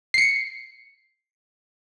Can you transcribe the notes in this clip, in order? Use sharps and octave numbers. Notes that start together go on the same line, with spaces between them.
C7 C#7